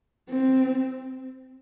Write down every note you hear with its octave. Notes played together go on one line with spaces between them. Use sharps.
C4